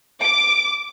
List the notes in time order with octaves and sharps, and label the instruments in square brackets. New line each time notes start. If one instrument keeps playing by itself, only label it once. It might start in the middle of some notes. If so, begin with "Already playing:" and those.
[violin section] D6